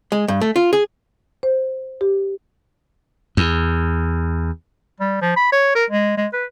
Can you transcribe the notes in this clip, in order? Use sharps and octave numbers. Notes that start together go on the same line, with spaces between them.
G#3
G2
A3
F4
G#4
C5
G4
E2
G3
F3
B5
C#5
A#4
G#3
G#3
B4